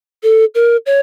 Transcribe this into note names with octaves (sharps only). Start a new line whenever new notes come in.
A4
A#4
C#5